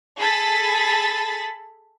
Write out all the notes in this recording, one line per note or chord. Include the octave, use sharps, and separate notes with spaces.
G#4 A4 B5 A6 B6